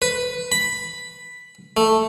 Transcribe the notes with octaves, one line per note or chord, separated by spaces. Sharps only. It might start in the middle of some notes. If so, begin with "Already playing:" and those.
B4
B5
A3